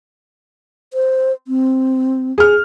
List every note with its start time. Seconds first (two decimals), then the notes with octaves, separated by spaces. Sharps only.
0.94 C5
1.48 C4
2.38 G#4 F6